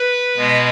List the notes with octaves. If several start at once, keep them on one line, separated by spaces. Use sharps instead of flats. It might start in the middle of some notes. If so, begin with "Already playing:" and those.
Already playing: B4
B2 G#3 B3